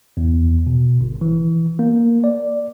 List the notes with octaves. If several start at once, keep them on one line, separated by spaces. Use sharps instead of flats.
E2
B2
G1
E3
A#3
D5